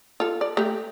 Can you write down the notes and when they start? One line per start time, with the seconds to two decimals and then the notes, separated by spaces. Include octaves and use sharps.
0.20 F4 A4
0.41 D5
0.57 A3 G4